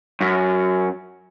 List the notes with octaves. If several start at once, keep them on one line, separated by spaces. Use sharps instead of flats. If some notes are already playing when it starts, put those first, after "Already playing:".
F#2